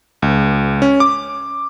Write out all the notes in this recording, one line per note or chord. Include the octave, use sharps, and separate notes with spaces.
C#2
C#4
D6